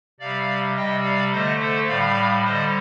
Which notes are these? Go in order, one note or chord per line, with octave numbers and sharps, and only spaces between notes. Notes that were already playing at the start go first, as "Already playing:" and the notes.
C3 G3 D5 F5
C3 G3 D#5 G5
D5 F5
D3 A3 C5 D#5
A4 C5
A2 G3 D5 F5
D3 G3 C5 D#5